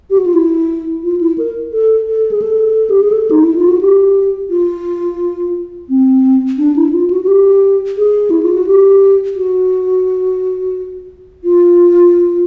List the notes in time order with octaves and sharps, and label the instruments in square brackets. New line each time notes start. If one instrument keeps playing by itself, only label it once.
[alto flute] G4
F#4
F4
E4
F4
E4
A#4
A4
A4
G#4
A4
G4
G#4
A4
D#4
E4
F4
F#4
G4
F4
C4
D4
E4
F4
F#4
F#4
G4
G#4
E4
F4
F#4
G4
F#4
F4